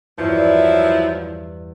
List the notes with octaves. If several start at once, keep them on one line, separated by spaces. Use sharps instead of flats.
E2 G2 F3 F#3 E4 D5